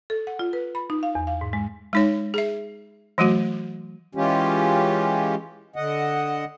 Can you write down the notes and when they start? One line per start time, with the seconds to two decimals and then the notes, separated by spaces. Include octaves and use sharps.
0.10 A4
0.27 F#5
0.39 F4
0.53 B4
0.75 B5
0.90 D#4
1.03 F5
1.15 E2
1.27 F5
1.41 G#2
1.53 G#3
1.93 G#3 D#4 C#5
2.34 G#4 E5
3.18 E3 F#3 A3 F#4
4.15 E3 G#3 C#4 F4 G4
5.76 D3 D#5 F#5